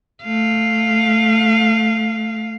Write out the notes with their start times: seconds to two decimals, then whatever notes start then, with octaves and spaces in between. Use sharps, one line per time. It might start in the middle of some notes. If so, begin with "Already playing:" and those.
0.24 A3 F5